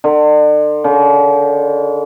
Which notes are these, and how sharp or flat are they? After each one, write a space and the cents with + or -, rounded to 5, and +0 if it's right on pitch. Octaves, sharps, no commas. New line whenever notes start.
D3 +40
D3 -45